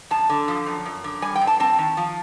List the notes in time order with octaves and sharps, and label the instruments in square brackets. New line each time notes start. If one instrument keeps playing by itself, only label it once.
[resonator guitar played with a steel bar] F#2 A5
D3
F3
F#2
F#2
D3
G3 G#5
G5
G2
A5
C4 A5
D#3
F3